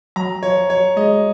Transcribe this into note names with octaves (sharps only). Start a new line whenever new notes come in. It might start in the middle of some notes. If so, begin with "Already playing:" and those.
F#3 A#5
F3 C#5
F#3 C#5
G#3 D#5